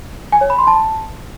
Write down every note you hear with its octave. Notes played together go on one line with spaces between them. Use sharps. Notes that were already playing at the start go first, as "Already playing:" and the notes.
G#5
C#5
B5
C6
A5